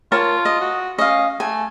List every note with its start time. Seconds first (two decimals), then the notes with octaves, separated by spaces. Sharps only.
0.12 F4 A#4 C#5 A5
0.45 D#5
0.61 F#4
0.99 C#4 D#5 F5
1.40 A3 G#5